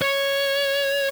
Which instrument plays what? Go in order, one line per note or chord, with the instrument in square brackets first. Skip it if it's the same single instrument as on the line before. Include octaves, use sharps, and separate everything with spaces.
[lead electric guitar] C#5